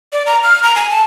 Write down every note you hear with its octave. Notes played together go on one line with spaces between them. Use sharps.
D5
A#5
F6
A#5
G#5
A5